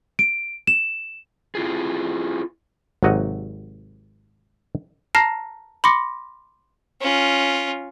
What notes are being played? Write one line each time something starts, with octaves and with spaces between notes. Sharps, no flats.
D7
E7
E4 F4 G#4
G#1 C3 F#3 D#5 F#5
A5 A#5 F6 A#6 C7
B5 C6 D6 A#6 C#7
C#4 F4